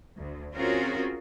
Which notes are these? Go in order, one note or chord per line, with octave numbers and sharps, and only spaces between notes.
D2
C4 C#4 F4 F#4 G#4 A#4